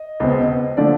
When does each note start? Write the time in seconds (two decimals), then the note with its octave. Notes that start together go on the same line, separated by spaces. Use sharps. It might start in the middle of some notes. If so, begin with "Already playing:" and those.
Already playing: D#5
0.20 C#2 B2 G#3 C4
0.77 D3 F3 A3 D5